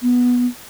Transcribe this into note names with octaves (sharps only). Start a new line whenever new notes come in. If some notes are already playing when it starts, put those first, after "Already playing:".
B3